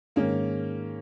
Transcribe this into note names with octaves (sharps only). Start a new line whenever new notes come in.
G#2 D#3 G#3 A#3 C#4